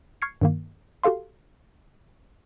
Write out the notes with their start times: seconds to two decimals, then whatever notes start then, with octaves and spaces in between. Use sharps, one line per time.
0.22 C#6 F6 G#6 C7 C#7
0.41 G2 D#3 A#3
1.04 F#4 G4 A4 F5 C6